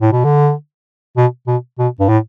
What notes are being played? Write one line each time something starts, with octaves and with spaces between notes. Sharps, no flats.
A2
B2
D3
B2
B2
B2
G2
A2